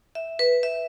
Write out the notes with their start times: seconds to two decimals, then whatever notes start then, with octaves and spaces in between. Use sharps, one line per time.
0.15 E5
0.39 B4
0.63 E5